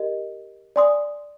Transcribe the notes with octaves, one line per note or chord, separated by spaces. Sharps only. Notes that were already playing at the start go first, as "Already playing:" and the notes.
Already playing: G4 A#4 D#5
D5 G#5 C6 D#6